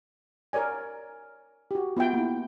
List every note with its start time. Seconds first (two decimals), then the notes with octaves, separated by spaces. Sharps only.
0.53 A#4 C#5 D5 G#5
1.71 F#4 G4
1.97 B3 F4 E5 G5
2.13 A#3 E4